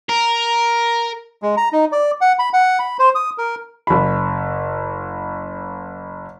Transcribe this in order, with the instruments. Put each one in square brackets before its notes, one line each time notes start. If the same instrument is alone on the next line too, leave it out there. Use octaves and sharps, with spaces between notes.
[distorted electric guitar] A#4
[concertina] G#3
A#5
D#4
D5
F#5
B5
F#5
B5
C5
D#6
A#4
[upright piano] F#1 B5